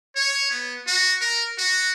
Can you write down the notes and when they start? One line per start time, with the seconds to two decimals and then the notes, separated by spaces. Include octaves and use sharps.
0.16 C#5
0.50 B3
0.87 F#4
1.21 A#4
1.58 F#4